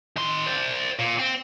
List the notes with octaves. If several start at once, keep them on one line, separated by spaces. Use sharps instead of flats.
D#3 C6
C5 D5
A#2
C4